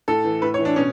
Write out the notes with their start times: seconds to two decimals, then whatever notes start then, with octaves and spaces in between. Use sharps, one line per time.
0.08 A2 A4
0.24 E3
0.42 A2 B4
0.54 C#5
0.59 E3
0.65 D4
0.76 B2 C#4